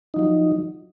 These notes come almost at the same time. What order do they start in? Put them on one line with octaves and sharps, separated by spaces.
D#4 F3 F#3